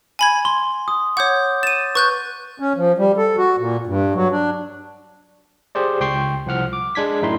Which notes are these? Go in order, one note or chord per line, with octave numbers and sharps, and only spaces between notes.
G#5 B5 G#6
C6 G7
D#6
C#5 F#5 D6 G6
A6 D#7 E7
B4 C#6 F#6 G6
C#4
F3
G3
A4
F#4
A#2
G2
F#3
D4
G4 G#4 C5 D5
C#2 G5 C6 C#6 C7
C2 F3 F#5 F6
D6
G#3 D4 G#6 B6
F#2 A2 D#4 E4 C6